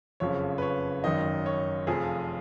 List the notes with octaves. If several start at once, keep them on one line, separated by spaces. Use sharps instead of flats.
F#1 F2 C#3 F3 C#5
B4
C#5
G#1 F#2 D#3 D#5
C#5
F1 F2 F3 G#4